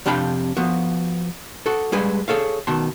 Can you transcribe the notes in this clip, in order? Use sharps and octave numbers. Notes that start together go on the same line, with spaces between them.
F2 C3 D4 F5 G5 B5
F3 B3 F#4
F#4 A4
G3 G#3 G#4 B4
G#4 A4 C#5 F5
B2 D#3 A5 C6